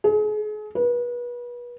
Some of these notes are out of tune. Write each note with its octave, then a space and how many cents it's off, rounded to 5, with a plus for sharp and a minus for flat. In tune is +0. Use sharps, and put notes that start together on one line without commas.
G#4 +35
B4 -35